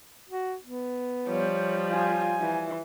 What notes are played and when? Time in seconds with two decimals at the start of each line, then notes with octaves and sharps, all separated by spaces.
0.30 F#4
0.65 B3
1.28 F3 G3 C#5
1.92 F4 G#5
2.41 E3